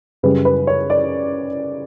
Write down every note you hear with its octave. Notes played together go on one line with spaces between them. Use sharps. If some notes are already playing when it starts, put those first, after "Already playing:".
F#2 C#3 G3 B4
B4
C#5
D5